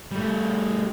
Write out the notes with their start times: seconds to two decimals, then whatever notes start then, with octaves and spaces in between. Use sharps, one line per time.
0.11 G3 A3